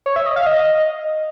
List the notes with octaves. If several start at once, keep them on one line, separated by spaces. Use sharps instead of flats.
C#5
E5
D#5
F5
D#5